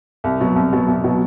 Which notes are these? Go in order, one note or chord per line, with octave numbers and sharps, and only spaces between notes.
C2
B2 F#3
C2
B2 F#3
C2
B2 F#3